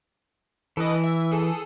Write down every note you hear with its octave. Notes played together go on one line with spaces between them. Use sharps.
E3 A4 B4 D#5
E5
G#4 A4